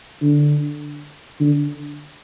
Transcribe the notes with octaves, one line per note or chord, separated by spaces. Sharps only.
D3
D3